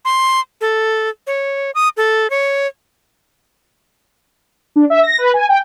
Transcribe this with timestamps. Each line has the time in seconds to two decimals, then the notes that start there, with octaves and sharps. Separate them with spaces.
0.05 C6
0.61 A4
1.27 C#5
1.75 D#6
1.97 A4
2.30 C#5
4.76 D4
4.90 E5
5.03 A#6
5.18 B4
5.34 G#5
5.49 G5